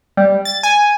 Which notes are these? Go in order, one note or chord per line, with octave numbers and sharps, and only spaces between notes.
G3
A6
G#5